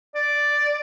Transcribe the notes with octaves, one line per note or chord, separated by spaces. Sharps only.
D5